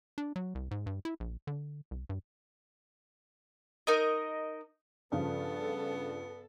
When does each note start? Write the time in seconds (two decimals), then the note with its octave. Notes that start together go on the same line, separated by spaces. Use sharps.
0.18 D4
0.36 F#3
0.55 C2
0.71 G#2
0.86 G2
1.05 E4
1.20 A#1
1.47 D3
1.91 C2
2.09 G2
3.87 D#4 A#4 D#5
5.12 G2 C#3 F3 B3 A4